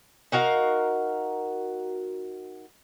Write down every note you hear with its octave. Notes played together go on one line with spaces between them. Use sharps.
D#4 F#4 A#4 F5